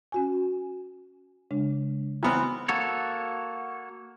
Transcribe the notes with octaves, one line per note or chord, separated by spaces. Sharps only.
C#4 F#4 G#5
C#3 G#3 D4
E3 B3 C4 A#5 F6
A#3 F#4 A4 C#5